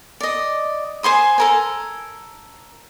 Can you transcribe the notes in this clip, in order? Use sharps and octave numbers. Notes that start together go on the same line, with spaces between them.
D5 D#5
C5 G#5 C6 D#6
A4 A#4 G#5